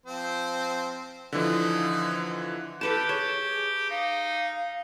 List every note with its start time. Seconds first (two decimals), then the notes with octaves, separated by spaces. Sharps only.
0.06 F3 C4 C5
1.32 D3 E3 F3 D#4
2.81 G4 A4 B4 A5
3.09 G#4 C#5 A5
3.90 D#4 F5